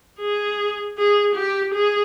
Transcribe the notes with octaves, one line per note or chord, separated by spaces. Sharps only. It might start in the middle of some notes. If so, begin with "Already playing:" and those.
G#4
G#4
G4
G#4